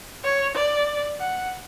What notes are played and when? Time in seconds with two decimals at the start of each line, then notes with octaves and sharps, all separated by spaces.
0.24 C#5
0.56 D5
1.20 F#5